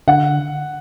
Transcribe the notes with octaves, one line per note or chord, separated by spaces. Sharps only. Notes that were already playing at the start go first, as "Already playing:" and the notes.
D3 F#5